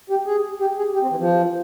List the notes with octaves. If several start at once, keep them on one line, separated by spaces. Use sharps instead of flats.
G4
G#4
G4
G#4
G4
C4
E3
F3